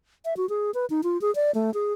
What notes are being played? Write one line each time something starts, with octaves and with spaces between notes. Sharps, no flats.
E5
F#4
G#4
B4
D#4
F4
G#4
D5
A3
G#4